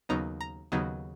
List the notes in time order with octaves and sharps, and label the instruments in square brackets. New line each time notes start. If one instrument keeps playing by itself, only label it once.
[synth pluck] D#2 C#3 F#3 B3 D#4 A#5
A#5
D#2 C#3 F#3 B3 D#4